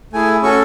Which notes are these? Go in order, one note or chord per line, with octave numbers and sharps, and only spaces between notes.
A3 E4 G#4 G#5
C#4 F#4 A4 C#6